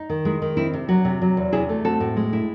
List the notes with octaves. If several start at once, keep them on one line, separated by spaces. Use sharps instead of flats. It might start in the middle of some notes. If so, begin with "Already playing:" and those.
Already playing: D#4
D#3
G#3 E4
D#3
C4 E4
C3
F#3 F#4
C3
F#3
E2
C3 E4 G#4
A3
C4 F#4 A4
A2
G#3
E4